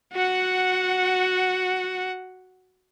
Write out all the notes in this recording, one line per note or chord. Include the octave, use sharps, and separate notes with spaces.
F#4 F#5